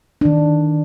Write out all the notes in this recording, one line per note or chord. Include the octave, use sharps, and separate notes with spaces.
D#3 D4